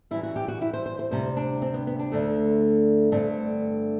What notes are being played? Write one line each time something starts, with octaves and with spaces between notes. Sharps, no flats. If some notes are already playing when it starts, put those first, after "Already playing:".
F#2 E3 G3 E4
F#4
G4
F#4
E4
C5
C5
C5
D2 C3 G3 C5
D4
C4
B3
B3
D4
D2 D3 A3
G2 D3 A3 C4